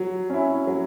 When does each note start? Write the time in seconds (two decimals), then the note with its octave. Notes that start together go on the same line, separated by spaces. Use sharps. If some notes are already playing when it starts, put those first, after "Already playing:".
Already playing: F#3
0.30 C#4 E4
0.67 F#3